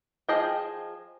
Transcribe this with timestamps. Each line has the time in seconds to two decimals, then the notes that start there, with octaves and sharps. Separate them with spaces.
0.29 F3 G#4 D#5 G5